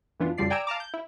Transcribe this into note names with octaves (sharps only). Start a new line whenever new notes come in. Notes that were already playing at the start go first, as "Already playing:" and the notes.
F#2 E3 B3 D4 F4
F#2 C#3 F3 G3 D5 C7
D5 G5 G#5 A#5 E6 D7
F5 A5 A#5 D6
G6
E4